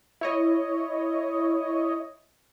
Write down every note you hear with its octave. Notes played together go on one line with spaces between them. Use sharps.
E4 C#5 D#5